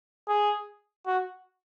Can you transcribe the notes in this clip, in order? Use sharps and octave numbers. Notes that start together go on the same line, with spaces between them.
G#4
F#4